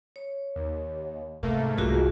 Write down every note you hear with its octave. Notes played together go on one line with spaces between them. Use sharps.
C#5
D#2
G#2 C3 A3 A#3
C2 C3 F4 F#4 G#4